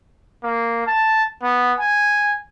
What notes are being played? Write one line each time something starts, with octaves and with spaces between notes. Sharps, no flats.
A#3
A5
B3
G#5